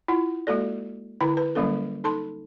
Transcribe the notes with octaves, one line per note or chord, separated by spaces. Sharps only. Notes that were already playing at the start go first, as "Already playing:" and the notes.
E4 F4 F#5
G#3 A#3 F#4 A4 D5
D3 E4 B4 G5 A#5
B4
D3 F#3 G3 A#3 C#4 A4
D#4 A4 A5 C6